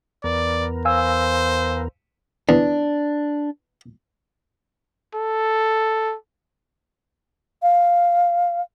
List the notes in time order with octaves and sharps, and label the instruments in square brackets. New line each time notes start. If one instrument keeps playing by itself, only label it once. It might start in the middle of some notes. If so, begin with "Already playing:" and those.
[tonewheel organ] E2 B3 A#4 [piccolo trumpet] D5
[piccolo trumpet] C5 [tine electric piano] F5 G#5 E6
[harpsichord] E2 [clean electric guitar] D4
[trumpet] A4
[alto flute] F5